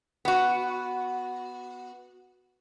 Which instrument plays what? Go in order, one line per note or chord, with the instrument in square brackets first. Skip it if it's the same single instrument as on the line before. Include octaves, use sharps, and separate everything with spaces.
[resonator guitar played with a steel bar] B3 F#4